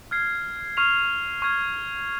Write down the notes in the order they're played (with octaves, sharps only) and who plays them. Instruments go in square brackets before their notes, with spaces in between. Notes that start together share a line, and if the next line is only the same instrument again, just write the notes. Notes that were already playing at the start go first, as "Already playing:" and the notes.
[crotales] F6 G#6 C7
C#6 F6 C7 F7
C#6 F6 G#6